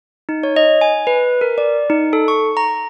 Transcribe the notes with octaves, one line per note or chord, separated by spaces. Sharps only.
D#4
C#5
D#5
G#5
B4
A#4
D5
D#4
A4
C#6
A#5